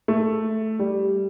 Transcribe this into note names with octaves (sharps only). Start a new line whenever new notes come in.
A3
G3